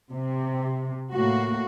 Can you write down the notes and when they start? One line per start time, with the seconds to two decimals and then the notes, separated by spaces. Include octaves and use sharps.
0.12 C3
1.14 A2 A#3 F#4